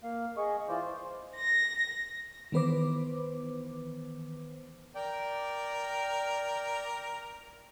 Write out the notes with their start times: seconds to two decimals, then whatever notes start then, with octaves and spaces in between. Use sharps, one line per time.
0.04 A#3 F5
0.37 G#4 D#5 C#6
0.69 E3 F4 C5 D5
0.85 C5
1.35 A#6
2.52 D#3 E3 B3 B4 C5 D6
4.95 A#4 D5 G5